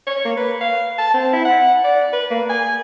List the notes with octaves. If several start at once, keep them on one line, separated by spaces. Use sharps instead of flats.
C#5
A#3
B4
F5
A5
C4
E4
F#5
D5
B4
A#3
G#5